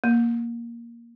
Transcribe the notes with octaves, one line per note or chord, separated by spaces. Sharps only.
A#3